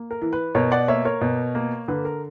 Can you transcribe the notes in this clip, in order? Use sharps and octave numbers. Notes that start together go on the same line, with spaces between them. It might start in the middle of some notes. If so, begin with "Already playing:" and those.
Already playing: A#3
A#4
E3
B4
B2 A#4 C#5
D5 F#5
A#3 C#5 E5
A#4 C#5
B2
A#3
D3 B4
A#4